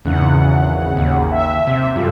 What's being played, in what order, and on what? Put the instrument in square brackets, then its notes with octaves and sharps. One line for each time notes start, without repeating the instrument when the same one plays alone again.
[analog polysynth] G#1 C#3 F#5 [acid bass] E2
[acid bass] D#2
[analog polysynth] E5
[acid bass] C3
[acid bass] F#2 [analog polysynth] G3 F4 A4